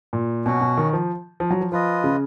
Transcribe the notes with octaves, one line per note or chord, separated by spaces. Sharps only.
A#2
B2 F#3 C#4 F#4
B2
D#3
F3
F3
F#3
F3
F3 F4 B4 D#5
C#3